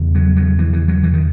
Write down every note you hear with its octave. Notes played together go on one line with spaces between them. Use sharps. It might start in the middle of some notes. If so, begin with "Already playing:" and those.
Already playing: E2 C#3
F#3
F#3
E3
E3
F#3
E3
D#3